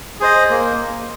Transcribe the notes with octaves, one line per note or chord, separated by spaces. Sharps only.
G#4 C5 D#5
A#3